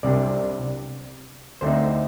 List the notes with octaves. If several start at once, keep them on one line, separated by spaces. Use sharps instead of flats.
C2 C3 G3 D4 D5
D2 D3 A3 C4 D#4 C5